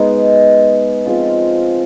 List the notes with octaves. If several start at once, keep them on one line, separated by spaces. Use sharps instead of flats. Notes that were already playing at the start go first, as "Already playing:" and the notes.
Already playing: G#3 B3 D#4
F3 G#3 C4 F4